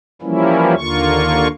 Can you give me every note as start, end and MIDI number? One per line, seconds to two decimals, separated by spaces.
0.22 0.75 52
0.22 0.75 53
0.22 0.75 55
0.22 0.75 58
0.22 0.75 61
0.22 0.75 64
0.76 1.48 39
0.76 1.48 50
0.76 1.48 58
0.76 1.48 65
0.76 1.48 85